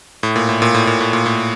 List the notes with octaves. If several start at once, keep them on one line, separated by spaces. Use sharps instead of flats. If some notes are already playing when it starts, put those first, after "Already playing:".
A2
A#2
A2
A#2
A2
A#2
A2
A#2
A2